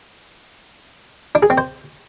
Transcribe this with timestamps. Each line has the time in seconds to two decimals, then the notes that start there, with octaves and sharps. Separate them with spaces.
1.35 D4
1.43 G#4
1.50 C4
1.58 C5